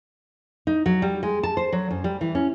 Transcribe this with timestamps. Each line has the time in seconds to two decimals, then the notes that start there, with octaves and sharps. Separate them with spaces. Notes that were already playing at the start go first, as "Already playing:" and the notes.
0.67 D#4
0.86 F#3
1.02 G3
1.23 G#3
1.43 A5
1.57 C5
1.72 F#3
1.91 F#2
2.04 G3
2.21 E3
2.35 C#4